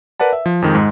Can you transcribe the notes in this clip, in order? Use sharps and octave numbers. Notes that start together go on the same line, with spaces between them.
A#4 B4 D5 F#5 A5
E5
F3
F2 D#3 G#3
G#2 G#3